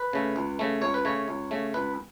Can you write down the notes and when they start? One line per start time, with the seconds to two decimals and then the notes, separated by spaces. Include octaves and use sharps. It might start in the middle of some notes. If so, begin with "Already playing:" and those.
Already playing: B4
0.13 C#3 A3
0.36 C#2
0.59 C#3 A3
0.81 C#2 C#5
0.94 B4
1.05 C#3 A3 C#5
1.28 C#2
1.51 C#3 A3
1.74 C#2 B4